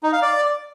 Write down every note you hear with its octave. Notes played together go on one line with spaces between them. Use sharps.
D#4
F5
D5